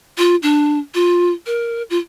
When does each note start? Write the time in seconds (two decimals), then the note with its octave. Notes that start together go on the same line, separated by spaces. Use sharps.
0.18 F4
0.43 D4
0.94 F4
1.46 A#4
1.90 F4